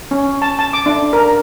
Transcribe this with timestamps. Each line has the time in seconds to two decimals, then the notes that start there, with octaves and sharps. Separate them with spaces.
0.11 C#4
0.42 A5
0.59 A5
0.73 D6
0.86 D4
1.13 A#4